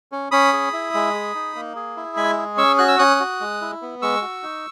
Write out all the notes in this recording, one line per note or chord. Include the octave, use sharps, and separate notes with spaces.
C#4
C#4 B5 D#6
G#4
E4
G#3
G#4
D#4
A#3
G#4
E4
G#3 G#5 B5
G#4
C#4 C#6 E6
F#4 F#6
E6
C#4 D#6 F#6
F#4
G#3
E4
B3
G#3 C#6 E6
F#4
D#4